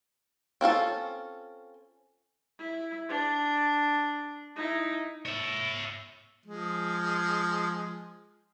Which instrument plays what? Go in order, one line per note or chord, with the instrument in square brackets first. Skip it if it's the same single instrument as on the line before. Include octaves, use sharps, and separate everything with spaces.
[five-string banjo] C4 C#4 F4 A4
[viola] E4
D4
D#4 E4
[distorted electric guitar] C#5 E5
[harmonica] F3 G#3